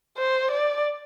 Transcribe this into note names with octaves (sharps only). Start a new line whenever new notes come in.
C5
D5